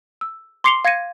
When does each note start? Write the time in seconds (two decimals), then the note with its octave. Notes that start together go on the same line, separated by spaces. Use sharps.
0.21 E6
0.64 C6 D6 C7 C#7 F7 G7
0.85 F5 G#6 A#6 C#7 D#7